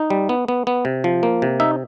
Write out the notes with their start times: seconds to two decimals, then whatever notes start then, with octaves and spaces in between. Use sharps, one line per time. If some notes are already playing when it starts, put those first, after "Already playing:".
Already playing: D#4
0.10 G3
0.29 B3
0.48 B3
0.67 B3
0.85 C3
1.04 F3
1.23 A#3
1.42 C3
1.60 D#4 E5